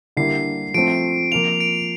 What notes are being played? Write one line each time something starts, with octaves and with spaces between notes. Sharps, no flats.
D3 G3 A#3 E4 C7
F3 A3 C4 D7
F3 A#3 F4 F7
D7